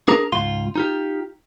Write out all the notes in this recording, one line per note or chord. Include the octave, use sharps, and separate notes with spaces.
D4 G#4 A#4 A#5
C#2 G#2 F4 C6
D#4 F4 G4